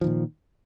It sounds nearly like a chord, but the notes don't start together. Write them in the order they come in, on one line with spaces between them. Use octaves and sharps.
F3 D#3 A#2